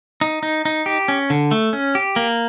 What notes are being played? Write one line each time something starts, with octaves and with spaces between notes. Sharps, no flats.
D#4
D#4
D#4
G4
C#4
D3
A3
C#4
G4
A#3